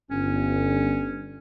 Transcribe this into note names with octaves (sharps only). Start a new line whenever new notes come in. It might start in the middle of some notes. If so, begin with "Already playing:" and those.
G1 C#4